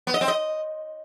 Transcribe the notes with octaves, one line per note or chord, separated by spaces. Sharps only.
B3
D#5
C4
D#5